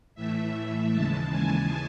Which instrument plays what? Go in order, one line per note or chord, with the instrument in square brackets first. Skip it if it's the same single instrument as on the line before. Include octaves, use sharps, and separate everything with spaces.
[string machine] A2 E3 A3 E5
D#2 C#3 E3 G#3 A5
G#5